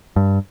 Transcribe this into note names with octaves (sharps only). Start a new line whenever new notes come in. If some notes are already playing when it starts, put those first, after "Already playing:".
G2